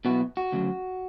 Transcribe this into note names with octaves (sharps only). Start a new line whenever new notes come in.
B2 F#3 B3 E4 F#4
F#4
D2 C#3 F#3